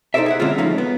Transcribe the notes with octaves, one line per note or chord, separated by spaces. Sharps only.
D#4 E4 A4 C5 D5 E5
G#4 E5 F#5
D3 G#3 C4 C#4 E4 F4
F3 G#3 A3 C#4 D#4 F4
B3